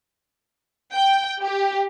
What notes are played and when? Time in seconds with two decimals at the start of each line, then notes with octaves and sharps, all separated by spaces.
0.94 G5
1.43 G4